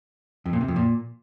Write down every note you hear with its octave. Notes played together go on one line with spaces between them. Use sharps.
F2
A#2
C3
F2
A#2